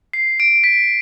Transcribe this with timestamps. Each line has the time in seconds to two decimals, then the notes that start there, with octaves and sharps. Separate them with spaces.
0.13 C7
0.40 D7
0.64 B6